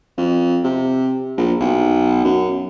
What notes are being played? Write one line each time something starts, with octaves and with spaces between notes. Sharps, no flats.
F2
C3
A#1
B1
F#2